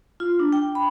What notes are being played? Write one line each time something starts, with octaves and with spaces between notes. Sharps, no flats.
F4
D4
G5
B5